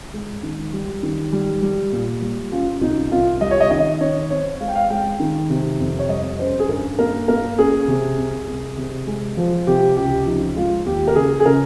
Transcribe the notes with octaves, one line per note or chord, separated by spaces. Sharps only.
G#3
D#3
G3
D#3
G3
G3
A#2
G3
C#4 F4
C2 D#4
C2 F4
G3 D#5
C#5
D#5
D#3 D#5
D#3 C#5
C4 C#5
G#3 F5
G5
F5
G#3 G5
D#3
C3
F2
C#5
G3 D#5
C#4 C5
G#4
G2 A#4
A#3 A#4
A#3 A#4
C#4 G#4
C3
C2
C2
C3
G#3
F3
C3 G4
C#2 G4
F3 D#4
G#3 F4
D#2 G4
A#4
C#3 G#4
G#4
C#3 A#4